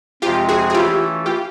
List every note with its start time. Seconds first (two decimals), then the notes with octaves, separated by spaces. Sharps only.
0.22 F2 C3 F3 G#3 C4 F4 G4
0.49 F#4 G#4
0.70 G#4
0.74 E3 A3 C#4 E4 F4 G4
1.26 F4 G4